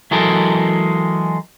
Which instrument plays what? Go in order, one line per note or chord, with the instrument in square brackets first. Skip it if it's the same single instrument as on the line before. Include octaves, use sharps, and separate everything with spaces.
[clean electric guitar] E3 F#3 G#3 A4 A#4